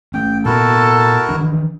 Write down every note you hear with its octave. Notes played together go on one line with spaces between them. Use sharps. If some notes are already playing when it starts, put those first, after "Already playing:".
A3 C#4 G5
A#2 B3 E4 F#4 A4 A#4
D#3 E3 D4